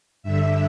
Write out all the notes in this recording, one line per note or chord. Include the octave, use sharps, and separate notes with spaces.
G2 D3 E5